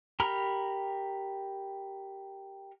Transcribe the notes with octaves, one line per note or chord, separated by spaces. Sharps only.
G4 A#4 A#5 B5 F6